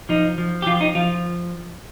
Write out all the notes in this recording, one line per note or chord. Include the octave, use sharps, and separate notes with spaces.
F3 D#4
F3
G4
F3 F4
D#4
F3 F4